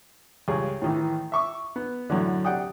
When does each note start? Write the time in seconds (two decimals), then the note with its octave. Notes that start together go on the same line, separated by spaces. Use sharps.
0.48 C#2 G2 G#4
0.82 A2 D#3 E3
1.32 E5 C#6 D6
1.76 B3
2.10 F#2 A2 D3
2.45 C3 D4 F#5 G5 D#6